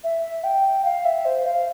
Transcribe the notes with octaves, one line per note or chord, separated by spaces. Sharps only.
E5
G5
F5
E5
C5
F5